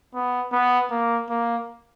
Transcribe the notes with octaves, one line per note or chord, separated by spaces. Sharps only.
B3
B3
A#3
A#3